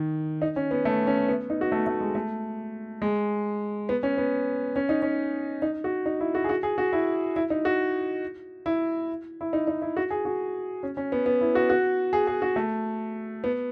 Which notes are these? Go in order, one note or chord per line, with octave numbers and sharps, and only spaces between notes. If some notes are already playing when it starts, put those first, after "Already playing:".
Already playing: D#3
D#4
C#4
B3
A3
C#4
B3
D#4
F#4
A3
A3
G#3
A3
G#3
B3
C#4
B3
C#4
D#4
C#4
D#4
F#4
D#4
E4
F#4
G#4
F#4
G#4
F#4
E4
E4
D#4
F#4
E4
E4
D#4
D#4
E4
F#4
G#4
F#4
C#4
C#4
B3
B3
E4
F#4
F#4
G#4
G#4
F#4
A3
B3